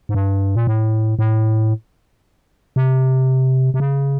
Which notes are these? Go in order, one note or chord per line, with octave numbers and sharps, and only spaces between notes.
G#2
G2
A#2
A2
A2
C3
C3
C#3